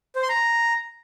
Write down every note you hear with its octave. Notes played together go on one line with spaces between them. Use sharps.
C5
C6
A#5